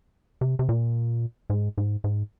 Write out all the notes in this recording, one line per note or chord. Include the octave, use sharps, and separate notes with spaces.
C3
C3
A#2
G#2
G#2
G#2